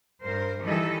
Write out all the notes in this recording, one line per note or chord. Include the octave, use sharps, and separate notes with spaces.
G2 A#4 C5
D#3 E3 G3 G4 A4 D#5